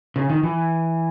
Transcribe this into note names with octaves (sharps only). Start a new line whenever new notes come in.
C#3
D#3
E3